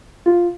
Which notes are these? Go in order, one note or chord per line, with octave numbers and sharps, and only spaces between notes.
F4